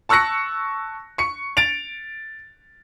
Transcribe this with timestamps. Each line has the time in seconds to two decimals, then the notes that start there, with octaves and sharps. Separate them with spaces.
0.09 A5 C#6 E6 F#6 A#6 C#7
1.18 C#6 C#7
1.57 A6 D7 F7